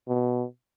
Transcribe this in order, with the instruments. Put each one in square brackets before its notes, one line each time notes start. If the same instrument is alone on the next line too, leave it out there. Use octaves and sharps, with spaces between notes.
[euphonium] B2